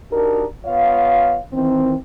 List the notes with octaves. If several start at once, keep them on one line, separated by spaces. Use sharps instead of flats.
D4 D#4 F#4 G4 A#4
B3 F4 C#5 F5
D#3 E3 C4